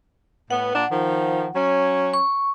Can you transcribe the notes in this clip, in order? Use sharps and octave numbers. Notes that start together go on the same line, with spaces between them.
A2 B3 F#5
A#2 D4
D#3 F3
F#3 C#4
C#6